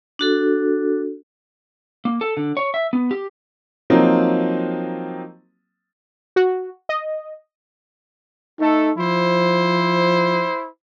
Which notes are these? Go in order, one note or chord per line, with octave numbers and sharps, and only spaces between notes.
D4 F#4 A4
A#3
A4
D3
C#5
E5
B3
G4
F3 F#3 A#3 C4 D#4
F#4
D#5
A3 D#4 A4
F3 E4 C5